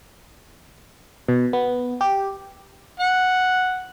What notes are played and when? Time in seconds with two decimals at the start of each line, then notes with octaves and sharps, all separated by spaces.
1.28 B2
1.53 B3
2.01 G4
3.00 F#5